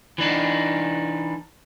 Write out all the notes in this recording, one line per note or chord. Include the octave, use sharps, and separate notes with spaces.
E3 D4 D#4